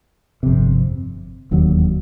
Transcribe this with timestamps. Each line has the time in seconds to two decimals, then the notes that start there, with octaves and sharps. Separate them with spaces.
0.43 G1 F2 C3
1.51 E1 D#2 D3 F#3